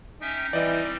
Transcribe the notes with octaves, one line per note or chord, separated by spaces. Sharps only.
C#4 D#4 E5 G5
E3 G3 C4 D5 D#5